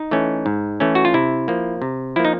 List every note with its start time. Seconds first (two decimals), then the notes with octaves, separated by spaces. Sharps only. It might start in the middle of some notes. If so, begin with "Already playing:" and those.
Already playing: D#4
0.11 E3 A3 C#4
0.46 G#2
0.80 E3 A3 C#4
0.95 F#4
1.05 F4
1.14 C3 E4
1.48 F3 A#3
1.82 C3
2.16 F3 A#3 E4
2.25 D#4